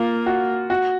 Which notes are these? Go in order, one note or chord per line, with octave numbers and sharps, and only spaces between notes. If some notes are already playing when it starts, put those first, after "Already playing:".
Already playing: A#3 F4
F#4
F#4